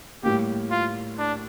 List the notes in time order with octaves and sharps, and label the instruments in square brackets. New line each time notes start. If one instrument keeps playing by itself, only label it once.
[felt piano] A2 G3 A#3 [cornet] G4
[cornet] F4
D4